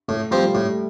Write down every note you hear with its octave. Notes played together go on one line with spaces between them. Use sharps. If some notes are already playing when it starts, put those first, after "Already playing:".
A2 A3
F3 G3 C4 F4 C5
A2 A3